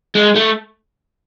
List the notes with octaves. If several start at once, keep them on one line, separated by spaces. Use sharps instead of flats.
G#3
A3